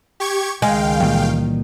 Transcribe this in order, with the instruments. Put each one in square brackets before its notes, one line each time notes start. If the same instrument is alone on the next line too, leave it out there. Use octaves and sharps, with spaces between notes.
[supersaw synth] G4 C#6 G#6
[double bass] C#2 D#3 [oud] G#3 [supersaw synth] F5 G5
[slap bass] A#2 E3 G3